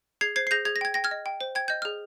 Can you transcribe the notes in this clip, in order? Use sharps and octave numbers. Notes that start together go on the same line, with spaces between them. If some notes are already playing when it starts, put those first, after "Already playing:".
G#4 G#6 C7
C5 G#6 C7
C7
G#4 G6 A#6
G#4 G#6
A#6
G5 G#6
G5 A#6
F6 G#6
D#5
G5
C5
G5 G#6
D#5 G6
G#4 F6